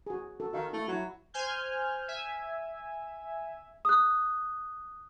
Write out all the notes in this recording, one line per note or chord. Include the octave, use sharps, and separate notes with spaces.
F#4 G#4
F#4 A4
D#3 F#4 D#5 F5
A3 E4
F#3 E4 F#4
C5 G#5 F6 G6
E5 G#5
D#6 F#6